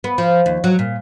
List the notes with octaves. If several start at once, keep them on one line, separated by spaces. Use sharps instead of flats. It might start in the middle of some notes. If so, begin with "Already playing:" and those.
B3
F3
D#2
F#3
A#2